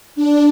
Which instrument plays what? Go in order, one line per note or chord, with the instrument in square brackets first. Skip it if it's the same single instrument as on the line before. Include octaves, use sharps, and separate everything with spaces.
[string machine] D4